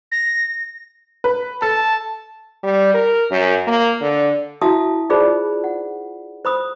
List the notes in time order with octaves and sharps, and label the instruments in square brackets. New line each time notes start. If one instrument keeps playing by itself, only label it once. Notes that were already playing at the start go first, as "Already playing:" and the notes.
[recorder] A#6
[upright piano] B4
[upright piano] A4 [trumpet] A5
[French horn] G3
A#4
F#2
A#3
D3
[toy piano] E4 F#4 E5 F5 A5 D#6
D#4 F4 G#4 C5 D5 B5
F#5
C5 B5 D#6